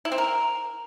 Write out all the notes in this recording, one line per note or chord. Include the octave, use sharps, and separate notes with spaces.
E4
C4
A#4